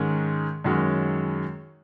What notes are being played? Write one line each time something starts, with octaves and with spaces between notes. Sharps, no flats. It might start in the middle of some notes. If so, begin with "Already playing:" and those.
Already playing: G#2 D#3 G#3 C#4
F#2 D#3 G#3 C#4 F#4